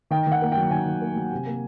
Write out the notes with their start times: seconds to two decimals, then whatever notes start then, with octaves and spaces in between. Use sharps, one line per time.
0.11 D#3 G5
0.27 D#3 F#5
0.42 A#3
0.52 G5
0.57 F#3
0.71 D#3 G#5
0.86 D#3
1.02 A#3
1.16 F#3
1.32 C3
1.47 A#3